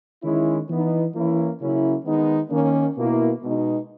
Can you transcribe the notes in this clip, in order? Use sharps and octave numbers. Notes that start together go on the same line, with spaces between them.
D#3 G#3 C#4 E4
E3 B3 D#4
E3 A#3 C#4 E4
C#3 F#3 A#3 C#4 E4
D#3 G#3 B3 D#4
D#3 A#3 C#4
B2 A#3 E4
B2 G#3 D#4